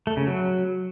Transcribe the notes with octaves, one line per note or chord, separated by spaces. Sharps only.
A3
C#3
F#3